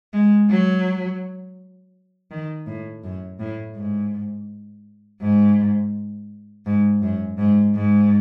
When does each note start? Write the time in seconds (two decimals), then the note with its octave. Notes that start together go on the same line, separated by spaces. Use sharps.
0.13 G#3
0.50 F#3
2.31 D#3
2.67 A2
3.04 F#2
3.39 A2
3.76 G#2
5.21 G#2
6.66 G#2
7.02 F#2
7.38 G#2
7.74 G#2